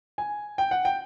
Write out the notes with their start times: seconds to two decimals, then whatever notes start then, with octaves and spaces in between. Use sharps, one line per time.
0.18 G#5
0.58 G5
0.71 F#5
0.85 G5